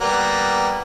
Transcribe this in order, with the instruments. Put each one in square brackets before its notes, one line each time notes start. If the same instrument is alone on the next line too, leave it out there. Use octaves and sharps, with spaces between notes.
[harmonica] G3 A#3 B3